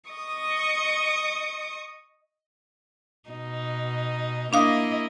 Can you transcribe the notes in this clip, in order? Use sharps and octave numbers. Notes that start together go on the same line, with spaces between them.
D#5 C#6 D#6
B2 D#4
A#3 D4 E4 D#5 F5 D#6